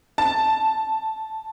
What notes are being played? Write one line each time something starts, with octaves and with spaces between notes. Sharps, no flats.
A5